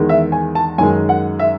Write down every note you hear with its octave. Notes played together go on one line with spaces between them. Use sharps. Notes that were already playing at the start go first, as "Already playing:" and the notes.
Already playing: E2 D#3 G#3
E5
G#5
A5
F#2 D#3 G#3 G#5
F#5
E5